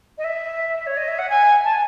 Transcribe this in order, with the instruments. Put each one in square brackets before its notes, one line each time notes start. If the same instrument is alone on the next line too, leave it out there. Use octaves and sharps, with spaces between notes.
[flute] D#5
E5
C#5
D#5
E5
F#5
G#5
A5
G#5